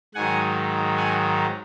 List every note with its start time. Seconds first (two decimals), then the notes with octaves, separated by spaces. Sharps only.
0.14 G#2 D#3 F#3 F#5 G#5
0.97 F#5 G#5